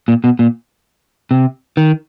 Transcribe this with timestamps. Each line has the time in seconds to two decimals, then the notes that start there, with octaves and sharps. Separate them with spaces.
0.08 A#2
0.24 B2
0.39 A#2
1.31 C3
1.77 D#3